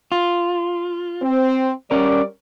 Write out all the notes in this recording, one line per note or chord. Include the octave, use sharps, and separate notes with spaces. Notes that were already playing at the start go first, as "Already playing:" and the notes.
F4
C4
G3 C#4 A#4 D5